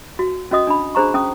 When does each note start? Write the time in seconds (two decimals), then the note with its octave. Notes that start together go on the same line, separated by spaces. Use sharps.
0.19 F#4
0.51 C#4 F#4 D#5 D#6
0.67 D4 B5
0.95 D4 G#4 C5 A#5 C#6
1.14 C#4 D#6